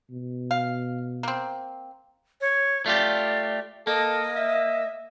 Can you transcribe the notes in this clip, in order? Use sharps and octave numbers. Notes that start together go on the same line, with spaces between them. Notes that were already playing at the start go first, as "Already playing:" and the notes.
B2
F5
A#3 C4
C#5
A3 F4 G4 D5
A#3 A4 D#5
E5